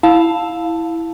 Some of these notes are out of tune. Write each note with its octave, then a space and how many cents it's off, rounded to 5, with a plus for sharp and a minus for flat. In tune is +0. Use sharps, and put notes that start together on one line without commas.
E4 +0 F5 +10 A5 +5